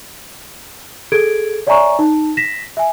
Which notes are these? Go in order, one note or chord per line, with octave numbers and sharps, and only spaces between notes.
G#4 A4 G#6 D7
C#5 D5 E5 G#5 A#5 C#6
D#4 A5
A#6 B6 E7
E5 G#5